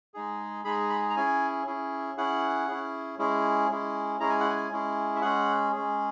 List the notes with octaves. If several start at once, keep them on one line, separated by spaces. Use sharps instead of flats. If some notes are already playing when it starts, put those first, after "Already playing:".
G#3 D#4 G#4
G#3 D#4 G#4 B5
B5
A#5
C#4 E4 G#4 G#5
C#4 E4 G#4
C#4 E4 G#4 F#5
C#4 E4 G#4
G#3 C#4 E4 G#4
G#3 C#4 E4 G#4
G#3 C#4 E4 G#4 A#5
G#5
F#5
G#5
G#3 C#4 E4 G#4
E5
G#3 C#4 G#4 F#5
G#3 C#4 G#4